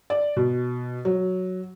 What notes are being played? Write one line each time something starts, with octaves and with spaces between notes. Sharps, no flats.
D5
B2
F#3